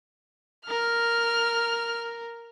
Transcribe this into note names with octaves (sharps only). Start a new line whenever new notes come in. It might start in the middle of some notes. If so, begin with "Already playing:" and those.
A#4 F6